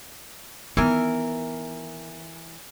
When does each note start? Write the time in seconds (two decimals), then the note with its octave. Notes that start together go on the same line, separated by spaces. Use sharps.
0.77 D#3 E3 B3 A#4